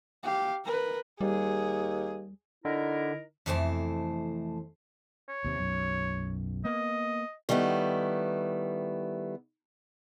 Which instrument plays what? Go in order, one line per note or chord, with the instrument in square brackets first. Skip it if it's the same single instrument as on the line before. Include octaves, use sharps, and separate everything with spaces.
[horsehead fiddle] G4 F5
A#4 B4
[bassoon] D#2 [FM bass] G3 [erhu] G#4
[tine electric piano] D3 [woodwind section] D#4 E4 A#4
[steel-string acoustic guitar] F2 C3 E3 A3 C5 A5
[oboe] C#5
[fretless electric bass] D#2 C3
B1 F#2
[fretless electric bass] A#3 B3 [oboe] D#5
[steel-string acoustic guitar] D#3 G3 A3 B3 E4